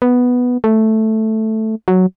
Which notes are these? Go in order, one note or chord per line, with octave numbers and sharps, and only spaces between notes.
B3
A3
F#3